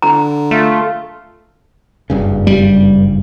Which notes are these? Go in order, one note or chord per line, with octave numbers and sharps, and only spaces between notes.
D3 A#5
A3 F4
F#1 G2 C#3
G3